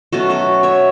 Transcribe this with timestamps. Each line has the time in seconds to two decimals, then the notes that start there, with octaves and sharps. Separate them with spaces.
0.12 B2 F#3 A3 C#4 F#4 A4
0.30 F#4 A4
0.63 C#5 E5